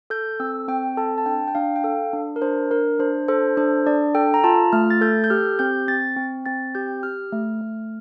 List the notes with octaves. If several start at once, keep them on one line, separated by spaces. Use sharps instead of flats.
A4 G6
C4 E6
C4 G5
A4 A5
A5
D4 G5
G5
D4 F5
G5
A4 F5
D4
A#4
D4 C5
D4 A#4
D4 C5
A4 C5
D4 C5
D4 D5
A4 G5
A#5
F4 A5
A3 F6
A6
A4 G6
G6
G4 F6
C4 G6
C4 A6
C4
C4 A6
G4 G6
G4 F6
A3
A3